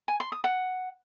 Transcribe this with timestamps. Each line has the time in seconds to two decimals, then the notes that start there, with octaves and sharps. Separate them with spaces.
0.08 G#5
0.20 C6
0.32 D#6
0.44 F#5